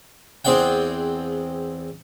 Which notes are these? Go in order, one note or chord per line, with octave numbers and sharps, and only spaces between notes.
E2 C4 G#4 D5 F#5 G5